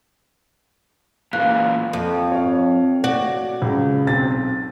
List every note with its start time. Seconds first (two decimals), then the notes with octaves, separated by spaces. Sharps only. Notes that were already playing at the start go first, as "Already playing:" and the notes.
1.33 A#2 E3 F5 F#6
1.93 F2
2.32 C#5 F5
3.04 F#4 D5
3.62 C#2
4.07 B1 C4 A6